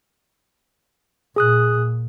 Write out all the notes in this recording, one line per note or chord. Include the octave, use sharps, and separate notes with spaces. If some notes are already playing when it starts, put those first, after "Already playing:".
A#2 G#4 D#6 F#6